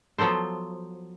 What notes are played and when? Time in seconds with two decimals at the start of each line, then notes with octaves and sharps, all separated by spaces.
0.18 F3 F#3 B3 A4 C5